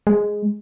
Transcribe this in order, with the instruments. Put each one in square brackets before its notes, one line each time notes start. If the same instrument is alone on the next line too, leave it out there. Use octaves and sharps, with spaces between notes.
[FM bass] G#3